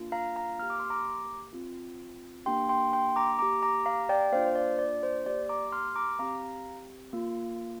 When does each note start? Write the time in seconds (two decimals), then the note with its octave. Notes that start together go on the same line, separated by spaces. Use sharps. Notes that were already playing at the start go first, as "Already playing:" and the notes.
Already playing: A#3 D4 F4
0.12 F5 A#5
0.36 F5 A#5
0.59 A#3 G4 F6
0.70 D6
0.80 C6
0.90 A#5 D6
1.53 C4 F4
2.46 A#3 D4 G4 G5 C6
2.69 G5 C6
2.93 G5 C6
3.16 A#5 D6
3.39 A#3 G4 A#5 D6
3.62 A#5 D6
3.86 F5 A#5
4.09 D5 G5
4.32 A#3 D4 F4 C5 F5
4.46 C5
4.55 D5
4.79 D5
5.03 C5
5.26 A#3 G4 D5
5.49 A#5 D6
5.72 C6 F6
5.96 A#5 D6
6.19 C4 G4 F5 A#5
7.13 A#3 F4